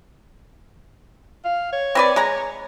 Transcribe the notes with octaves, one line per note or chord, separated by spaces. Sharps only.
F5
C#5
C4 B4 D5
G#3 A#5